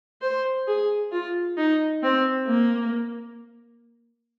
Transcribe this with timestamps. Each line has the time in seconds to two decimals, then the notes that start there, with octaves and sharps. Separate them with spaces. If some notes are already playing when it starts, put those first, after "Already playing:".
0.21 C5
0.67 G#4
1.11 F4
1.57 D#4
2.03 C4
2.47 A#3